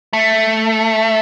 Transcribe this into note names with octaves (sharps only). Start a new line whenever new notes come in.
A3